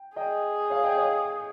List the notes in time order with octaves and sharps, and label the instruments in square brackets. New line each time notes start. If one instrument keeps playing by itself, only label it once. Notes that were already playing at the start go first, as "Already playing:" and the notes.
Already playing: [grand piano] G5
[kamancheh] G#4 [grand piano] D#5 G5
[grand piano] C#5 F5
D#5 G5
C#5 F5